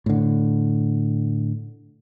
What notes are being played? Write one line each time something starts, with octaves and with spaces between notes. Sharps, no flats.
A2 D3